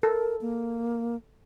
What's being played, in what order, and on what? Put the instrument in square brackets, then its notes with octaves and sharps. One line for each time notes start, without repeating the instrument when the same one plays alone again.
[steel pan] A4 [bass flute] A#4
[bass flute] A#3